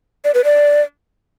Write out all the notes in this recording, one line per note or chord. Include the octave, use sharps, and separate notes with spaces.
D5
B4
D5